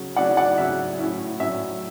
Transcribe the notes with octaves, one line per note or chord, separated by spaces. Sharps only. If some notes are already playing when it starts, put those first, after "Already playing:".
Already playing: C#3 F#3 C#4
C#3 F#3 C#4 D5 F#5
D5 F#5
C#3 F#3 C#4 E5
A2 F#3 C#4 E4
A2 F#3 C#4 E4 E5